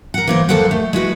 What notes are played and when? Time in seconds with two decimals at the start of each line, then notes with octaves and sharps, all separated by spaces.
0.14 A#4 F#5
0.27 E3 A#3 C5
0.49 D#2 D#3 A4 C5 F5 F#5
0.71 A3
0.93 G#3 E4 F#4 B4